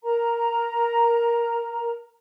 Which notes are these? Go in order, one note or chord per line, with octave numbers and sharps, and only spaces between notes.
A#4 A#5